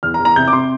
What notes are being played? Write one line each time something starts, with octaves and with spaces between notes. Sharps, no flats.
E2 F6
A#5
E2
A#5
C3 G6
D6
C3 C6